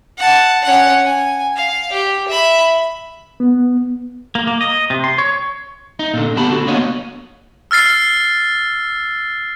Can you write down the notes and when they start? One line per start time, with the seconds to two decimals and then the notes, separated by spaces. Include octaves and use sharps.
0.18 F#5 A5
0.63 C#4 F#5
1.05 G#5
1.56 F5
1.92 G4
2.28 E5 B5
3.40 B3
4.35 A#3
4.47 A#3
4.61 D#5
4.90 C3
5.04 C6
5.18 C#5
5.99 D#4
6.14 A#2 D3
6.36 B3 G4 A5 B5
6.50 D3 F#4
6.67 A#3 B3 D4 F#4 C#5 D#5
7.71 E6 F6 A6 C7